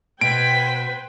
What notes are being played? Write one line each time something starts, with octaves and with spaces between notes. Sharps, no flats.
B2 B4 C5 G5 G#6 B6 D7